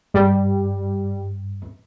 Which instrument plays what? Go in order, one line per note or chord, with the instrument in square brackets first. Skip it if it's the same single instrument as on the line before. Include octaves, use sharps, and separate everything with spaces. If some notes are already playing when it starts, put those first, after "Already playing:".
[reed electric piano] G2 [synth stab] G3